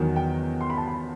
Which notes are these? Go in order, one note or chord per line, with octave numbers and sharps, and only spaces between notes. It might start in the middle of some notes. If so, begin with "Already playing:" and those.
Already playing: E2 D#3 F#3
G5
C6
B5
A5
B5